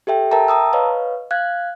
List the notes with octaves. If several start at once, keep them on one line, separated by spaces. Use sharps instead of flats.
G4 A4 E5 G5
A#4 E5 G5 A5 A#5
A5 A#5 D#6 E6
B4 C#5 D#5 F5
F5 F#6 G#6